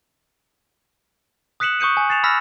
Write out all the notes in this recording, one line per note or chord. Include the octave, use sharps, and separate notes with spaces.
D#6 F#6 B6 C#7 E7 F#7
C#6 D#6 G6 C#7 D#7
G#5
A6 C7 E7 F7
B5 E6 F6 A#6 B6